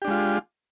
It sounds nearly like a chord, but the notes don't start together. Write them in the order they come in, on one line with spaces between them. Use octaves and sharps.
G4 D4 G#3 F4